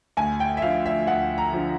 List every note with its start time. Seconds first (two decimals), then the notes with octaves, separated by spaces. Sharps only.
0.17 D2 G#5
0.40 G5
0.57 E5
0.62 D3 F3 F5
0.86 E5
1.07 D2 F#5
1.38 A#5
1.53 D3 F3